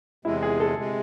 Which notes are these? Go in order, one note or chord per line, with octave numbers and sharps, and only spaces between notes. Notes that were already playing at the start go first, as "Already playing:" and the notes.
E2 C3 G#3 E4
G#4
A4
C3 G#3